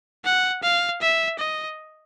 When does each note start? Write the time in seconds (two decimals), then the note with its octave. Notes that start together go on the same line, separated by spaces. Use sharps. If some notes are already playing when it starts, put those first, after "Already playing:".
0.25 F#5
0.63 F5
1.02 E5
1.39 D#5